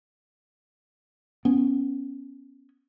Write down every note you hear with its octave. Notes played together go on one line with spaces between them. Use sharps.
B3 C#4